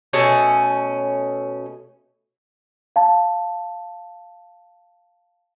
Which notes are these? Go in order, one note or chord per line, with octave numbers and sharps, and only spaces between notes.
B2 A3 C#4
F5 A5